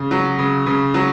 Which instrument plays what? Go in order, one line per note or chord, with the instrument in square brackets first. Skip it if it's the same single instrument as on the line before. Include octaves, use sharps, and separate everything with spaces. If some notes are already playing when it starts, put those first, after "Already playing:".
Already playing: [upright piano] C#3
F#3
C#3
C#3
F#3